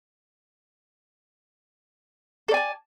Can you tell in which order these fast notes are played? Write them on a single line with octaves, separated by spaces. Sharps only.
A4 D5 G#5 A5